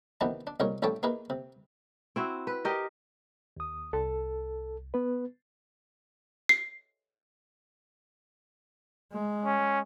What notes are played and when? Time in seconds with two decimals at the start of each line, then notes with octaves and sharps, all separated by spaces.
0.21 C3 D#3 E3 B3 D4 E4
0.47 D4
0.60 C2 A#2 G#3 C#4 A#4 C#5
0.82 A1 G3 A4 C#5 E5 G5
1.03 A#3 D#4 E4 G#4 A#4 B4
1.30 C3
2.16 C4 E4 F#4
2.47 B4
2.65 G4 A#4 D#5
3.57 D#2 D#6
3.93 C2 A4
4.94 B3 B4
6.49 C7
9.13 G#3
9.45 C#4